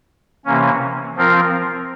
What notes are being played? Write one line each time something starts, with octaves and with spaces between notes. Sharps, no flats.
C3 E3 A#3 C#4
F3 C4 F4 A#4